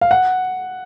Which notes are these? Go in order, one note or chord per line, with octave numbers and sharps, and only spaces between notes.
F5
F#5